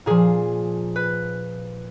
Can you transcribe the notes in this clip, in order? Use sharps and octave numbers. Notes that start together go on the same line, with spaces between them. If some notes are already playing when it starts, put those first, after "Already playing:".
A#2 F3 G#4
B4